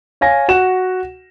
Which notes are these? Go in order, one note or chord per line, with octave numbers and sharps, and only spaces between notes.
C#5 F5 G#5 A#6
F#4 F#5 E7